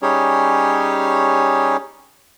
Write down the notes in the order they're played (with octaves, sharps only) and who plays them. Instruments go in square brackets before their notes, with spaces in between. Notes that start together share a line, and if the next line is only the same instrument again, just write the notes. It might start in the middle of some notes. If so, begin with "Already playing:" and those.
[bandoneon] G3 C#4 D#4 G4 G#4 C#5